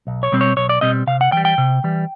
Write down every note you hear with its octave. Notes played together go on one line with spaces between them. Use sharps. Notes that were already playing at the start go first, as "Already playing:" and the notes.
B1
C#5
B2 G3 C4
C#5
B1 C#5
D5
B2 G3 C4 D#5
C3 F5
F#5
E3 G3 G5
G5
C3
E3 G3